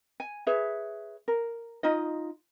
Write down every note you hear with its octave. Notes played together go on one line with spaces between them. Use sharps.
G#5
G#4 B4 C#5 E5
A#4
D#4 F4 D#5